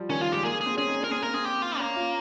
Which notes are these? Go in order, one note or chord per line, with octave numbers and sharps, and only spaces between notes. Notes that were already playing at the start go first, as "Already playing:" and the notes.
Already playing: F3 G3
D#3 C#4
F3 F4
G#3 G4
A#3 G#4
G#4
C4
C#4 G#4
D#4
C#4
A#4
C4 G#4
A#3 A#4
C4 G#4
G4
F4
A#3 C#4
F4